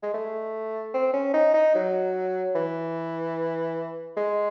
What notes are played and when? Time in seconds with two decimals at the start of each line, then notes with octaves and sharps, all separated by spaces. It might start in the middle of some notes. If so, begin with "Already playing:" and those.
0.03 G#3
0.14 A3
0.94 C4
1.14 C#4
1.34 D#4
1.54 D#4
1.75 F#3
2.55 E3
4.17 G#3